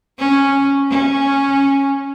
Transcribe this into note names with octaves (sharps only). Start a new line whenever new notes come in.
C#4
C#4